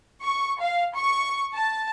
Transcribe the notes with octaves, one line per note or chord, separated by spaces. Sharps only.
C#6
F5
C#6
A5